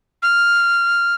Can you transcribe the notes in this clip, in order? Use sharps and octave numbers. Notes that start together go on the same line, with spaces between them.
F6